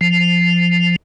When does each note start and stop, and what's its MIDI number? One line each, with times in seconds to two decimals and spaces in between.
0.01 0.96 53